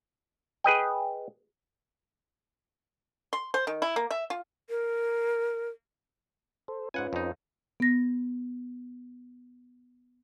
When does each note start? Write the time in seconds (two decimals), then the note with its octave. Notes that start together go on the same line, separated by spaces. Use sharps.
0.64 G#4 B4 D#5 G5
3.33 C6
3.54 C5
3.67 D#3
3.82 E4
3.96 A#3
4.11 E5
4.30 F4
4.70 A#4
6.68 A4 C5
6.94 G#2 C#4 F4 B4 F#5 G#5
7.13 F2 D#4
7.80 B3 A#6